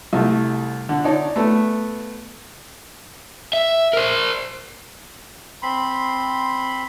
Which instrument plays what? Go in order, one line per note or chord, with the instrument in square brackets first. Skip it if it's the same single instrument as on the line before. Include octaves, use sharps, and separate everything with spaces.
[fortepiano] C2 A3
D3
D#4 C#5 D5 A5
A3 B3
[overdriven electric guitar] E5
A#4 C5
[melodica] C4 B5 C6